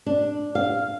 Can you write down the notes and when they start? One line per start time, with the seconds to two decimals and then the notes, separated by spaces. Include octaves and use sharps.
0.06 D4
0.55 F5